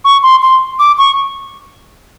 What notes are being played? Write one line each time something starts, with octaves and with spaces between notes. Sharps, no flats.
C#6
C6
C6
D6
C#6